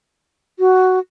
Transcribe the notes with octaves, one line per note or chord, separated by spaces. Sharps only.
F#4